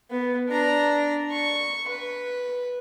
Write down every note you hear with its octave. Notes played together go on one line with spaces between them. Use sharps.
B3
D4 A#5
C#6
B4